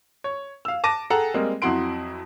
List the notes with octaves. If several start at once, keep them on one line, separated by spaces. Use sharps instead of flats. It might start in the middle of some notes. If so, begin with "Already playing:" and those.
C#5
F5 E6
A5 D6 A#6 D#7
G#4 A4 F#5 G5 A#5
G3 G#3 A#3 C4
F2 F#3 E4 F#5 C6 D7